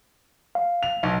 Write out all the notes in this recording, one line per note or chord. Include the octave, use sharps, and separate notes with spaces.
F5
F7
B1